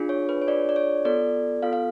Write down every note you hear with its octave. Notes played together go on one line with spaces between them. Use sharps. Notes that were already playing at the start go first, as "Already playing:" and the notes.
Already playing: D4 F4 G#4
C#5
B4
C#5
D4 F4 G#4 D5
D5
C#5
B3 F4 A4 D5
B3 F4 A4 F5
F5